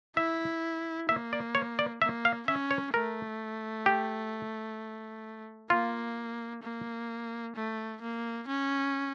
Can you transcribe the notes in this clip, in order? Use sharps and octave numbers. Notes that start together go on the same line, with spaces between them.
E4 E5
A#3 E5
D5
C#5
D5
A#3 E5
F5
C#4 E5
C#5
A3 A#4
G4
A#3 F4
A#3
A3
A#3
C#4